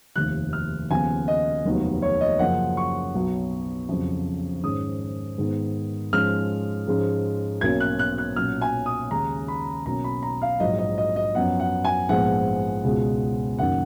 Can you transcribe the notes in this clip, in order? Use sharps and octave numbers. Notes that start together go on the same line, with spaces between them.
F1 D#2 D#3 F#6
F6
D#2 C#3 F3 B3 G#5
D#5
F1 D#2 D#3 F#3 B3
C#5
D#5
F#2 C#3 F3 A#3 F#5
C#6
B1 B2 F#3 B3
F2 C#3 F#3
G#2 D#3 G#3 C#4 D#6
G#2 D#3 G#3 B3
G#2 F3 G#3 C#4 F6
G#2 F3 G#3 C#4
B1 B2 A#3 C#4 G#6
F#6
F#6
F#6
B1 A#2 F#3 C#4 F6
G#5
D#6
D#2 C#3 G#3 C#4 A#5
B5
B1 B2 A#3 C#4 A#5
B5
A#5
F5
A#1 G#2 F#3 D#5
D#5
D#5
D#5
F#2 F3 B3 F#5
F#5
G#5
A#1 G#2 F3 G#3 B3 F#5
C#2 B2 G#3
F#1 F#2 D#3 A#3 C#4 F#5